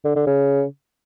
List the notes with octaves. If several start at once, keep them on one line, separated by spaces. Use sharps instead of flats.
D3
D3
C#3